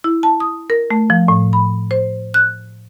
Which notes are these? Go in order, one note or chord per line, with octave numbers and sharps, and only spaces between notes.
E4
A5
D#6
A#4
A3
F3
A2
B5
C5
F#6